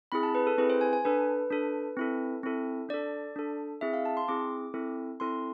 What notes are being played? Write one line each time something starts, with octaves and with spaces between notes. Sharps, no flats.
C4 E4 G#4 B5
A5
B4
A4
C4 E4 G#4 B4
C5
G#5
G#5
D4 A4 B4
D4 A4
C4 E4 A4
C4 E4 A4
D4 A4 D5
D4 A4
C4 E4 G#4 E5
F5
A5
C6
C4 E4 G#4 D6
C4 E4 A4
C4 E4 A4 C6